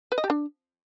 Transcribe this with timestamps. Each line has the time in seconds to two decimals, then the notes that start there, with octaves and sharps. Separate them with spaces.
0.12 B4
0.18 D#5
0.24 G4
0.30 D4